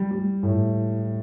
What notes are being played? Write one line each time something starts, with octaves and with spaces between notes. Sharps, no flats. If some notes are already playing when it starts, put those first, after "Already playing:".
Already playing: G3
G3
A2